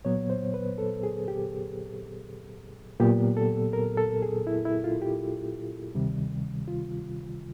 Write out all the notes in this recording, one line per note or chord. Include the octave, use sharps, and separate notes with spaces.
A#2 F#3 B3 C#5
C5
B4
A4
G#4
G4
A#2 F#3 B3 G4
A4
A#4
A4
G#4
E4
E4
F4
G4
D2 C3 D#3 G3
F4